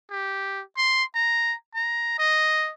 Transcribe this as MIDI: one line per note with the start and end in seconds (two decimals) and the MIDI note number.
0.11 0.62 67
0.77 1.04 84
1.15 1.54 82
1.75 2.17 82
2.19 2.71 75